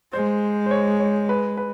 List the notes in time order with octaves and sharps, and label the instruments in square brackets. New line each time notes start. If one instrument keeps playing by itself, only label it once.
[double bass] G#3 [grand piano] C5
[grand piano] C5
C#5
C#5
B4
B4